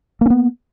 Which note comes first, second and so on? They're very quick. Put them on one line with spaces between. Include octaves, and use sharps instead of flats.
A#3 C#4 B3